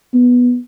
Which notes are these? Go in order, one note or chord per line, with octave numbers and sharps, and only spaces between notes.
B3